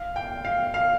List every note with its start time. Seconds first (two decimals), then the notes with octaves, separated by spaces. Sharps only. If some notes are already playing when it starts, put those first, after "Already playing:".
Already playing: F5
0.16 G5
0.45 F5
0.74 F5